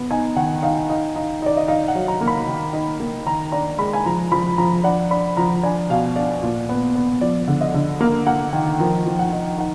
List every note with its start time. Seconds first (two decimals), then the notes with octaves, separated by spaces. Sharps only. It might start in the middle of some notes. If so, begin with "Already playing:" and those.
Already playing: B3
0.11 D#4 G#5
0.36 D#3 F#5
0.62 D#4 F5
0.90 D#4
1.16 D#4
1.42 D#4 D5
1.57 D#5
1.68 D#4 F5
1.88 F#5
1.95 F#3
2.08 A#5
2.21 A#3
2.27 B5
2.47 D#3
2.73 D#4
3.00 A#3
3.26 D#3 A#5
3.52 D4 A#5
3.79 G#3 B5
3.93 G#5
4.06 F3 A#5
4.32 F3 B5
4.58 F3 A#5
4.84 D4 F#5
5.11 D4 B5
5.37 F3 A#5
5.63 D4 G#5
5.90 B2 F5
6.16 D4 D5
6.43 A#2
6.69 B3
6.95 B3
7.21 F3 D5
7.48 D3
7.61 D#5
7.74 D3
8.01 A#3 A#5
8.27 A#3 F#5
8.53 D#3
8.80 F3 A#4
9.06 F3
9.19 F#5
9.33 D#4
9.58 D#4 F#5